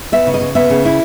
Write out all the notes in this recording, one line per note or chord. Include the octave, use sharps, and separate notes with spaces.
B3 E5
C#3
D#5
C#3
B3 E5
C#3
E4